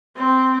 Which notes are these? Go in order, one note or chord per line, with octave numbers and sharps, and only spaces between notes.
C4